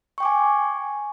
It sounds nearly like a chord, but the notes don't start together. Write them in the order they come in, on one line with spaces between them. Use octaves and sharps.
C#6 G5 D6 G#5